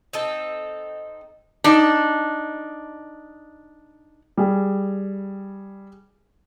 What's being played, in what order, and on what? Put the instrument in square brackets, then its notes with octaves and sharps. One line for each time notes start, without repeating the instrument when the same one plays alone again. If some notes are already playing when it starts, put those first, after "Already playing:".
[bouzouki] C4 D#4 A4
[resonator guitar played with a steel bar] D4 D#4
[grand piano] G3 G#4